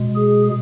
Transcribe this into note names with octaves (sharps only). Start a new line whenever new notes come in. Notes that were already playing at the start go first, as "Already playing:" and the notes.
Already playing: B2 G#3
G#4